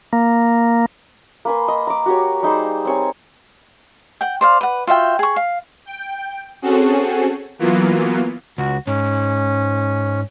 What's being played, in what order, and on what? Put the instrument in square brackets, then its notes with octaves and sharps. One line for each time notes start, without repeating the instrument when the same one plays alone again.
[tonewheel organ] A#3
[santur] A#3 B4 G#5 C6
D#5
A#5 D6
F#4 G4 C#5
G3 D#4 G#4 C5
C4 C#5 G#5
[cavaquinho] F#5 G5
C5 D5 F5
B4 F#5
F4 F#4 E5 G5
G#4 C#6
F5
[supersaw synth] G5
C4 C#4 F#4 G#4 A4
E3 F#3 A#3 B3 F4
[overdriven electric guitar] C#2 [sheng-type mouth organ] F#4
[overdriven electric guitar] G#2 [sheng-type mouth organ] C#4